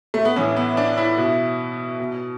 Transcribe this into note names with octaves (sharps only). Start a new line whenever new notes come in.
A3
B3
A2 E3 C#4
B3
D4
E4
B2
B2